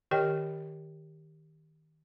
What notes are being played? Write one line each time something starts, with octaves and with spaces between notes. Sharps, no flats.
D#3 G4 A#4 D#5 G5